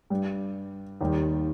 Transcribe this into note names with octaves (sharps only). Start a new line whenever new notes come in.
G2 G3
D#2 D#3 G3